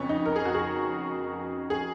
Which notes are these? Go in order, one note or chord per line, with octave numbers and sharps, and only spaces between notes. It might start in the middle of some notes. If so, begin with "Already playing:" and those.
Already playing: F2 C#3 B3 C#4
D#4
A#4
G#4
F#4
G#4
G#4